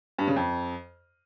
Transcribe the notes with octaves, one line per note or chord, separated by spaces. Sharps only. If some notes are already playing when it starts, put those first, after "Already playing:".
G2
C#3
F2